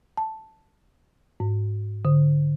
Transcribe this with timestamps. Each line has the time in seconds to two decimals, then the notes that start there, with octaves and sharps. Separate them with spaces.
0.17 A5
1.40 G#2
2.05 D3